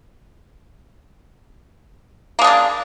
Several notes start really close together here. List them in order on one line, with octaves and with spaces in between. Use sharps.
A#3 G#3 D4 C#3